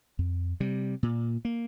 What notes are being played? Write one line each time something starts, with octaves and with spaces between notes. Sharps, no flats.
F2
C3 G3
A#2
A#3